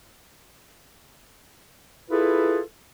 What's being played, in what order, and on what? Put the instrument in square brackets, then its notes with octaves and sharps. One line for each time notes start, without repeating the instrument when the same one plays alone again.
[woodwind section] E4 F4 G#4 A4 B4